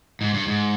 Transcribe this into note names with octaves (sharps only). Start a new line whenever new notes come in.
G#2
G2
G#2